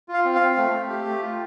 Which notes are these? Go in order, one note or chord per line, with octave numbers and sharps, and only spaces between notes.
F4
F5
C4
C4 F5
A3
A3
G4
A3
F4